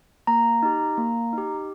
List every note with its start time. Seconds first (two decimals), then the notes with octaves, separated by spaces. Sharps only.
0.27 A#3 A#5
0.63 D#4 G4
0.97 A#3
1.33 D#4 G4